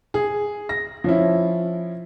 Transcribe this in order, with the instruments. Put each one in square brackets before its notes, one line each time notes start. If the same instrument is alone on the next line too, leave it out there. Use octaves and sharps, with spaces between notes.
[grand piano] G#4
A#6
F3 C#4 E4